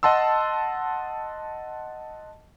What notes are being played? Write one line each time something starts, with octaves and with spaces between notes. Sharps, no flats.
D#5 F#5 A5 C6 E6